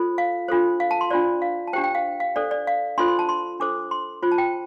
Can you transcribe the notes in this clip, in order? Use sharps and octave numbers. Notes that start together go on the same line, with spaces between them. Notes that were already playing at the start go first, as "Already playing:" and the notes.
Already playing: F4 A4 C5
F5
D4 F4 A4 C5
F5
A5
C6
D4 F4 C5 D5
F5
A5
D4 G4 C5 G5
G5
F5
F5
D4 A4 C5 D5
D5
F5
D4 F4 A4 C5 C6
C6
A5
C6
D4 A4 C5 D6
C6
F4 C5
A5
G5